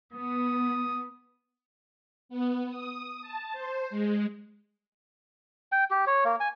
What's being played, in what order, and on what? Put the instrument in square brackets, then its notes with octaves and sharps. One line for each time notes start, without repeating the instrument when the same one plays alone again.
[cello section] B3 [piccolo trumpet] D#6
[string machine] B3
D#6
A5
C5
G#3
[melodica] G5
G4
C#5
A#3
G#5